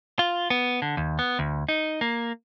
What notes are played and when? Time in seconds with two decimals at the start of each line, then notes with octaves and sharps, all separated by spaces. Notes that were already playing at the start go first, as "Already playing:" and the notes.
0.19 F4
0.50 B3
0.82 D3
0.97 D#2
1.19 B3
1.39 D2
1.69 D#4
2.01 A#3